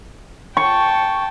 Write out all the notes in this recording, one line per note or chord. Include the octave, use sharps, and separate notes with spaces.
G5 A5 C#6